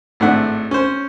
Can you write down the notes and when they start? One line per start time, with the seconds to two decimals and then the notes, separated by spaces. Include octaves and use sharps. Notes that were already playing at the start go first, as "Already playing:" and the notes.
0.20 G#1 A2 A3 D4 F#5
0.71 C#4 C5